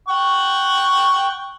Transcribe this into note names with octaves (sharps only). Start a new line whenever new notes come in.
F#5 G5 C#6